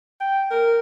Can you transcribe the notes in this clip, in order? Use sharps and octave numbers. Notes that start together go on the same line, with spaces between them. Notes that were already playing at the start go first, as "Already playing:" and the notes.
G5
A#4